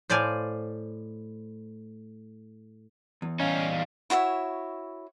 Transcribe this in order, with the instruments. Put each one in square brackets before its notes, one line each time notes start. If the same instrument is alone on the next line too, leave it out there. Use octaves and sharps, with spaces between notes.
[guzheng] A2 C5 D5 F5 G#5
[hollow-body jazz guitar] E2
[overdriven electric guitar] G3 D#4 [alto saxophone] C#4 [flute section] F5
[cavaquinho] E4 F#4 C#5 E5